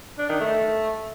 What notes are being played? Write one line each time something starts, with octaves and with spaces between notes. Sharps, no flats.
D4
D#3
A3